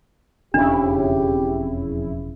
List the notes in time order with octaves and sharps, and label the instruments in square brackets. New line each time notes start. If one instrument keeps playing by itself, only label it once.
[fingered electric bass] E1 C#4 [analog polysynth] F2 C#3 E4 [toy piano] D4 [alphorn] G4